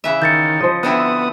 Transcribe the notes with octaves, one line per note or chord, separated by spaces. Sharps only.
C#3 E3 E5
D#3 G6 A6 C#7
F3 C5 D#5
D3 B3 C4 E4 D#6